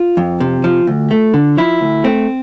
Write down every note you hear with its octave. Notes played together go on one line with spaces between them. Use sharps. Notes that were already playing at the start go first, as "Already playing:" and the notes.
Already playing: F4
F2
C3
F3
D2
A3
D3
F3 E4
D2
A3 C4